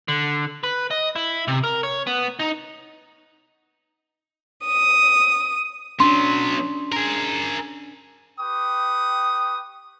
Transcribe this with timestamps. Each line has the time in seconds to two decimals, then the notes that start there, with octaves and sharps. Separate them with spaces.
0.08 D3
0.64 B4
0.91 D#5
1.16 E4
1.48 C3
1.64 A#4
1.83 C#5
2.07 B3
2.39 D#4
4.66 D#6
6.00 F#3 B3 C#4 D4 C6
6.92 G#4 A#4
8.39 G4 B4 G5 C#6 D#6